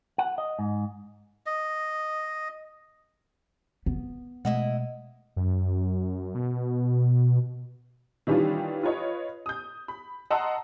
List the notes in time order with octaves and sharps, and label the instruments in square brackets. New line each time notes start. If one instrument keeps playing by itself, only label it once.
[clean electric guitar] F#5
D#5
G#2
[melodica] D#5
[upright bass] B3
[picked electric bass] B2 G#3 A3 [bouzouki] E4 D#5 F#5
[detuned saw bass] F#2
B2
[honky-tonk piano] D#3 E3 G3 C#4 D4 F4
F4 B4 C#5 D#5
D#6 G6
B5
D#5 F#5 A5 A#5 C6 E6